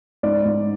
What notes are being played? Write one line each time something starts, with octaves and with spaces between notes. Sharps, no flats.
G#2 D5
G#2